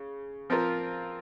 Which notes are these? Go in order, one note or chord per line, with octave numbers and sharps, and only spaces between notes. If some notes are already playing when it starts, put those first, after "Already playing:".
Already playing: C#3
F3 C4 F4 A#4